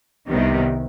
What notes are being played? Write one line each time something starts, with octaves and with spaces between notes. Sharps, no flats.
C2 C3 D#3 G3 B3